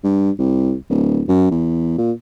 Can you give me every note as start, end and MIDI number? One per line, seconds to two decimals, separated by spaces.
0.04 0.31 43
0.39 0.74 36
0.90 1.22 26
1.28 1.50 42
1.51 1.93 40
1.98 2.12 46